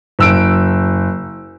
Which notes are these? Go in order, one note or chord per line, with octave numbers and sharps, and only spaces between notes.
F#1 E6 D7